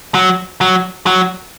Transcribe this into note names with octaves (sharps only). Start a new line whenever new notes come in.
F#3
F#3
F#3